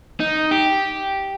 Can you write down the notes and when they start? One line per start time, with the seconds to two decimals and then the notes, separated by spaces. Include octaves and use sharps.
0.20 D#4
0.51 G4